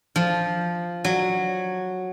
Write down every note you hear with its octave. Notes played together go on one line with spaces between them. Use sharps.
F3
F#3